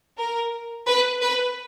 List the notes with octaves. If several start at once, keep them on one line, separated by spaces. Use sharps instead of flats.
A#4
B4
B4